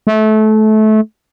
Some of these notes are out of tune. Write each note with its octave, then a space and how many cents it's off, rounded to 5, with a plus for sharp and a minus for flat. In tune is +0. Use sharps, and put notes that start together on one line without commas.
A3 -25